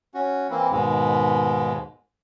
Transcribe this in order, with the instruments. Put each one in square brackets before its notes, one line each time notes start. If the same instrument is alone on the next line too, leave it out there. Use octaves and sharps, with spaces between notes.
[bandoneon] C#4 F#4
E3 A#3 C4 E4
D#2 G#2 B2 G#3